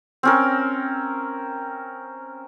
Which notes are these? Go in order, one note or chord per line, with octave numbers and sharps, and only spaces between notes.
C4 C#4 A#4